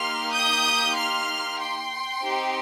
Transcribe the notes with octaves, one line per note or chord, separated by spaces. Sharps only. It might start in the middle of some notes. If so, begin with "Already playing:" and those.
Already playing: A#3 D#4 G4 C6 F6
D#6 G6
C6 F6
G5 C6
C4 D#4 G4